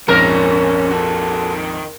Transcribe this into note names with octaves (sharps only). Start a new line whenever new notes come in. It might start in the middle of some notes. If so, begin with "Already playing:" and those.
A#1 F2 G#2 C#4 A#4
F#4 A4
D#3